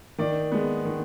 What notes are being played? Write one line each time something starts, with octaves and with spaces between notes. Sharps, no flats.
D#3 D5
G#3 B3
D#3